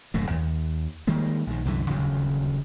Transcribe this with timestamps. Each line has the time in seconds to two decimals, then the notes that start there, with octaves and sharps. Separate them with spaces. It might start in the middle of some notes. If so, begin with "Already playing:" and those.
0.14 D#1 F#2 A2 A3
0.30 D#2
1.07 D#3 G3 G#3 A#3
1.47 A#1 D#3
1.65 C2 F#2 D3 E3
1.90 D#1 D2 C#3 F#3